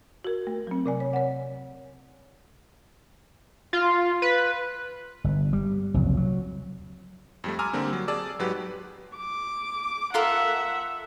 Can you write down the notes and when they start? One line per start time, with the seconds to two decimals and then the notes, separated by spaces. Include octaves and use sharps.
0.25 F#4 A#4
0.47 A3
0.67 F#3 C4
0.86 C3 D5 G#5
1.00 C#5
1.13 C#5 F#5
3.73 F4
4.22 B4
5.24 G1
5.53 G3
5.94 F#1 C2 F2 F#3
6.17 F#3
7.44 F2 G3 A3
7.59 G#5 A#5 C6 D6 E6 F6
7.73 D3 G3 A#3 C4
7.93 F#3
8.08 G#4 D5 A5 E6
8.39 G#2 F#3 G4 B4
9.17 D6
10.14 F4 A4 A#4 E5 F#5